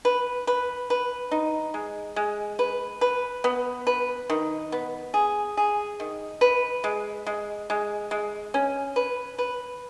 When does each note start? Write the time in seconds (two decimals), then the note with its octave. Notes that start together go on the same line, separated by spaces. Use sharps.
0.05 B4
0.47 B4
0.90 B4
1.31 D#4
1.74 G#3
2.16 G#3
2.59 B4
3.01 B4
3.44 B3
3.87 B4
4.30 D#3
4.72 B3
5.14 G#4
5.57 G#4
6.00 D#3
6.41 B4
6.84 G#3
7.27 G#3
7.70 G#3
8.11 G#3
8.54 C#4
8.96 B4
9.38 B4